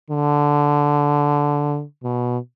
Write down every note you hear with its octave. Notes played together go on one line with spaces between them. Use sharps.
D3
B2